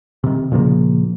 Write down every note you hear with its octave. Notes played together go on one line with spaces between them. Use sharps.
C3 D#3
A#2 C#3 F3 A#3